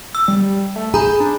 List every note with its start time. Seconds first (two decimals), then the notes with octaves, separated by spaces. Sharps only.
0.15 E6
0.28 G3
0.76 A3
0.94 G#4 A#5 B5 G6
1.20 D4